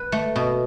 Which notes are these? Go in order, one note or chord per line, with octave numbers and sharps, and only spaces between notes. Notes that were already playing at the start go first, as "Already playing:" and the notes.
Already playing: B4
A3
B2